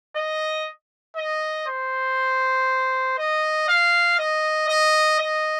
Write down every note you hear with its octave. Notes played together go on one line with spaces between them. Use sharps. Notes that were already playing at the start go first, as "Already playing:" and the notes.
D#5
D#5
C5
D#5
F5
D#5
D#5
D#5